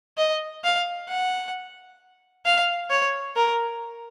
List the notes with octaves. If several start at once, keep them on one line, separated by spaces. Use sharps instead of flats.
D#5
F5
F#5
F5
C#5
A#4